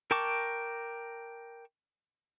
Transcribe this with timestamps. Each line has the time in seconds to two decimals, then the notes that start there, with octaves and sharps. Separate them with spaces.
0.11 A#4 G5 A5 C#6 D6